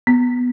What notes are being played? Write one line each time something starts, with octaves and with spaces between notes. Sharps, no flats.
B3